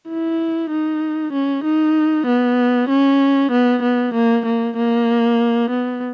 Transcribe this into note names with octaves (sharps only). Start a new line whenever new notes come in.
E4
D#4
C#4
D#4
B3
C#4
B3
B3
A#3
A#3
A#3
B3